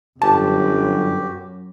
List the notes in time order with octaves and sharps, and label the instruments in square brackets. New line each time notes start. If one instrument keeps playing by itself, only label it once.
[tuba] G1 [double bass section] F#2 [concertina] F#4 G4 [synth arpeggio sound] A5